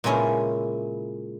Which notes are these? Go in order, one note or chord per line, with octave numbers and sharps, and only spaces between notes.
A#2 C#3 G#3 C#4 E4